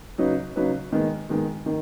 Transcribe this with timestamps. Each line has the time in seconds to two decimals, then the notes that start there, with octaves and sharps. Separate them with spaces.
0.18 C#3 F#3 D#4 B4
0.56 C#3 F#3 D#4 B4
0.92 D#3 G#3 B3
1.29 D#3 G#3 B3
1.66 D#3